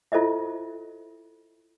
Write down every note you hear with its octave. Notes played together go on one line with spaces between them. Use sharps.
E4 F4 A4 C5 D#5 E5